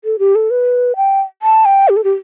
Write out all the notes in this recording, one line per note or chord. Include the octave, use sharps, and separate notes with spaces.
A4
G4
A4
B4
G5
A5
G5
G4
A4
G4